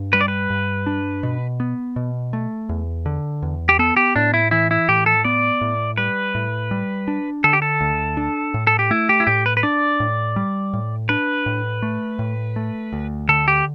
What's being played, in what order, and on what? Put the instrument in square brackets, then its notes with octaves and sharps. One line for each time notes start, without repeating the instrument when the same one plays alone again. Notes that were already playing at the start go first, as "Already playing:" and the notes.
Already playing: [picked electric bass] G2 D4
[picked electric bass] G3 [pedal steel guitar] B4
[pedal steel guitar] D5
B4
[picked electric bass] G2
D4
B2
B3
B2
A3
E2
D3
E2
[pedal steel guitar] G4
[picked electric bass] B3 [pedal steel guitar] A4
[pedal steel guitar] G4
[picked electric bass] A2 [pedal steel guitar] D4
[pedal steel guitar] E4
[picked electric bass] E3 [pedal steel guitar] E4
[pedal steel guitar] E4
[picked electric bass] A2 [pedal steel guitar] G4
[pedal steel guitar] A4
[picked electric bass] B3 [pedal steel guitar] D5
[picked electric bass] A2
[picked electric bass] G3 [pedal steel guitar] B4
[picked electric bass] A2
G3
D4
[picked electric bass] D3 [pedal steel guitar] A4
[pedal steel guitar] G4
A4
[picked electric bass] D2
D4
A2
[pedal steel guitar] A4
G4
[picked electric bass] A3 [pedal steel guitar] E4
[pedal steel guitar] G4
E4
[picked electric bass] A2 [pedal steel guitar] G4
[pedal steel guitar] B4
B4
[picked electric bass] D4 [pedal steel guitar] D5
[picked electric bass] A2
G3
A2
[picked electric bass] D4 [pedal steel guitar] B4
[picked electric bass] A2
A3
A2
A3
D2
[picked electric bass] D3 [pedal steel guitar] A4
[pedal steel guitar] G4